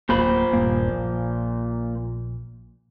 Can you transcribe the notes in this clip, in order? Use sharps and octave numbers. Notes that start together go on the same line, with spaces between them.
D1 D#2 A#2 A#3 C5 B5
D#1 G2 A#3
A#1